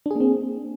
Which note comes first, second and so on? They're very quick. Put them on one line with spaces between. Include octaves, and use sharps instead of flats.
D4 G#4 A#3 C4